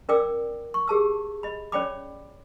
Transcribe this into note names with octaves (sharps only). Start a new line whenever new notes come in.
C#4 A#4 D5 G5 D6 E6
C#6
G4 G#4 A5 E6
D#5 B5
C#4 C#5 D5 G5 B5 D6